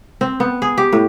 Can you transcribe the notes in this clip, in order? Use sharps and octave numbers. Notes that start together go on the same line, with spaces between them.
C4
B3
G#4
G4
A2